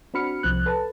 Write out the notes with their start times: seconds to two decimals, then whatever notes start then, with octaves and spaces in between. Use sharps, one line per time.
0.14 C4 D4 F#4 B5 F6 C#7
0.43 C2 F3 C4 F#6
0.66 A4 B4 A5